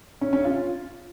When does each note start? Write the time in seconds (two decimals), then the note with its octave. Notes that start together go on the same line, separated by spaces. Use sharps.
0.21 C#4
0.33 C#4
0.44 F4